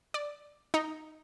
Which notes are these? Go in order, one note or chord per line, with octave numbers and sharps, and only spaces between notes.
D5
D#4